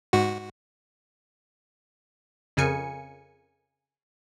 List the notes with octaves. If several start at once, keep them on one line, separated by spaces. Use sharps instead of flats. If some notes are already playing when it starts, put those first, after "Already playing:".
G#2 F#4
F2 C#3 A#4 G#5 C#7